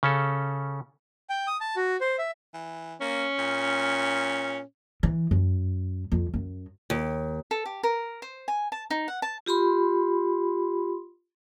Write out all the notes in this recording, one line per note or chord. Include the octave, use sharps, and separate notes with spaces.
C#3 C#4 A4
G5
D#6
A5
F#4
C5
E5
E3
A#3 C#4
A#2
E3
F#2
F2
F#2
D#2
A4
G4
A#4
C5
G#5
A5
D#4
F#5
A5
F4 G4 B5 C6